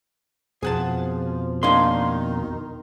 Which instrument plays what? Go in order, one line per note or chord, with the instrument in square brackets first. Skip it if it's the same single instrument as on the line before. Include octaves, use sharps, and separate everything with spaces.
[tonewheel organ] F2 B2 [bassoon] F3 [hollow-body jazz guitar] G#4 F#5 A5
[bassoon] D#3 [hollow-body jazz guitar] A#3 D4 D#4 [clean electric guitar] C6